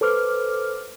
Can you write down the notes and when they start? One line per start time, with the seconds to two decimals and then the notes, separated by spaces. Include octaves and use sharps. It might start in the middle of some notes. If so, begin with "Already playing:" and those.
0.01 A4 B4 C5 D6 F6